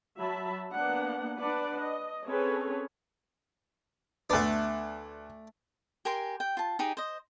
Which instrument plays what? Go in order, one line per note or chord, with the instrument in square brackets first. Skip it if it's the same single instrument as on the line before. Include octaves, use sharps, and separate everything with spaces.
[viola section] F#3 E5 A5 B5
A#3 B3 D4 F#5
D4 B4 D5 F#5
D#5
C4 C#4 G#4 A4 B4 C#5
[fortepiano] D2 B3 [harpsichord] A3 D4
[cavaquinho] G4 A#4 G#5 C6
G5
F4 A5
D#4 G4 G#4
C5 D#5